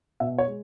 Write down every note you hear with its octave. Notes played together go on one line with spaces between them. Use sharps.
B2 E5
C#5
G#3